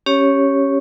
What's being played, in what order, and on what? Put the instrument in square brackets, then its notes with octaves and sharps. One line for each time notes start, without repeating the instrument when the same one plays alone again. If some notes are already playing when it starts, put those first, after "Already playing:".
[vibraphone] C#4 G4 C#5